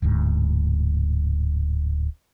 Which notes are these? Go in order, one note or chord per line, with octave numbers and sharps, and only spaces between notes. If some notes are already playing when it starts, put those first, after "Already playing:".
D1 D2 G#2